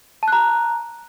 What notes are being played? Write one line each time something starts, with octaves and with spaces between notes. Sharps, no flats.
A5 A#5 F#6